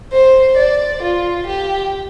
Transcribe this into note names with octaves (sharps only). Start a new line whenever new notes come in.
C5
D5
F4
G4